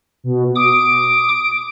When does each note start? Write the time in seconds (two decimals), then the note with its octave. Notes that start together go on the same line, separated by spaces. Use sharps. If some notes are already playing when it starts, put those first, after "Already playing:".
0.24 B2
0.56 D6 D#6 D7